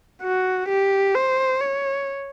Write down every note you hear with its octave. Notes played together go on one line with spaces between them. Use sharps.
F#4
G4
C5
C#5